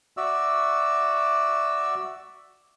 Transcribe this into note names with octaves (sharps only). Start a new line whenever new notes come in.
F#4 D5 E5 E6